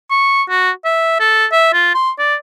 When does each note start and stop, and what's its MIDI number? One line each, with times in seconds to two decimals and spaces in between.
0.10 0.43 85
0.49 0.71 66
0.85 1.19 76
1.20 1.46 69
1.52 1.71 76
1.73 1.92 65
1.95 2.10 84
2.18 2.35 74